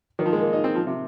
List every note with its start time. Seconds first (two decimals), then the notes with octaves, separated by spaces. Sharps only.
0.19 D#3
0.26 F3
0.33 G#3
0.41 A#3
0.53 D#4
0.64 C4
0.75 F3
0.87 C3